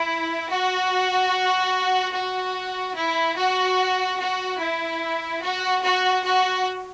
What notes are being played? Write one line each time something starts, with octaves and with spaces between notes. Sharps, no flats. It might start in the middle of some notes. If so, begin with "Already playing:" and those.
Already playing: E4
F#4
F#4
E4
F#4
F#4
E4
F#4
F#4
F#4